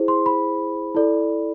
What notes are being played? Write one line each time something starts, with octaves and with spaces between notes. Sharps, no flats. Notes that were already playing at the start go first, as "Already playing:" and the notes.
Already playing: E4 G#4 C5
C6
B5
E4 A4 D5